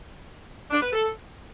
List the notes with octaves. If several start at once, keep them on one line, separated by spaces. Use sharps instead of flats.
D4
B4
A4